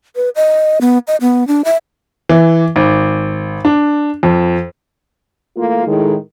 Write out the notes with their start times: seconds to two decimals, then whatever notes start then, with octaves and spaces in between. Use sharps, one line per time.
0.16 B4
0.36 D#5
0.81 B3
1.08 D#5
1.21 B3
1.48 D4
1.65 E5
2.29 E3
2.76 G#1
3.65 D4
4.23 F2
5.56 E3 A3 A#3 F4
5.86 A2 D#3 G#3